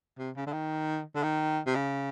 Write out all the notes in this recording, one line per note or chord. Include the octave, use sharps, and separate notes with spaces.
C3
C#3
D3
D#3
D3
D#3
C3
C#3